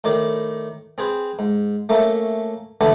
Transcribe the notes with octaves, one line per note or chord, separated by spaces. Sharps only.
A2 D#3 D5
C4 G#4 B4 C5
G#2
A3 A#3 C#4 E5
D3 E3 A3 B3 C#4 D4